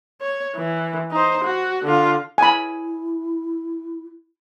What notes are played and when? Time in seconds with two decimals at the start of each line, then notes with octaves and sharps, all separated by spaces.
0.21 C#5
0.56 E3
1.11 D#4 C5
1.44 F#4
1.85 D3 F4
2.38 E4 G#5 B5